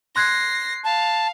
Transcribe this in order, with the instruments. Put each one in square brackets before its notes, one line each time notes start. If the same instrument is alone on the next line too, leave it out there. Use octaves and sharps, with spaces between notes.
[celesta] C6 F#6 G#6 [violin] A#6 C7
[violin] F5 [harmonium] A5